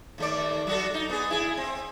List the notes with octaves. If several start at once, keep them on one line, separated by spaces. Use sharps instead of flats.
D#2 A3 D5
F#3 F#4 A4
D#4
B3 G#4
E4 G#4
C4